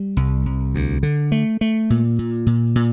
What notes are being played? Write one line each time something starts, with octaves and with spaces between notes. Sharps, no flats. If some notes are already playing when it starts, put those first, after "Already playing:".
Already playing: G3
C2
C2
D2
D3
A3
A3
A#2
A#2
A#2
A#2